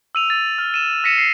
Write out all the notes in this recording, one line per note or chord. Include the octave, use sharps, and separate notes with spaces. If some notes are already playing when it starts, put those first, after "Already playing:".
E6 D#7 F7
A6
F6
D#7 E7
F6 A#6 B6 C#7 D#7 E7
C7